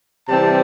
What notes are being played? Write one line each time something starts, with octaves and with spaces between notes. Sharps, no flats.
C3 E3 G3 C4 A5